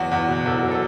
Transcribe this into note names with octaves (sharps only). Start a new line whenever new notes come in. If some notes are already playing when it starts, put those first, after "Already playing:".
Already playing: E2 F#3 F#4
E2
B2
E2 A4
F#3
A4